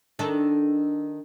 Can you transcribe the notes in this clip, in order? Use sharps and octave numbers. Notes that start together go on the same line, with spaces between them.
D#3 D4 A4